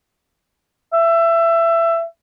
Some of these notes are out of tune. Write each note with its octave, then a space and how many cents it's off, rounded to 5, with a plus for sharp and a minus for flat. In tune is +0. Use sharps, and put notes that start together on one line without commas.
E5 +20